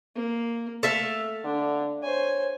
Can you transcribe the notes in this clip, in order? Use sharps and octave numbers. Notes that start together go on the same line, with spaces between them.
A#3
A3 A4 E5 F5
D3 D4
C5 C#5 G#5